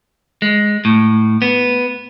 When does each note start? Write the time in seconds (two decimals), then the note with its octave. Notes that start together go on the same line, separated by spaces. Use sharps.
0.42 G#3
0.85 A2
1.42 B3